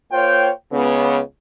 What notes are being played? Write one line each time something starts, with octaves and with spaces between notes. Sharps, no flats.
A#3 F4 C5 C#5 G5
C#2 C#3 B3